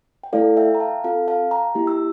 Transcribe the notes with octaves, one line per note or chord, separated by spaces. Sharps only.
G5
A3 E4 A4 D5 F5
E5 G5
A#5
F5 A5
C4 F4 A4 F5 A5
F5 A5
G5 A#5
A#3 E4 G4
E6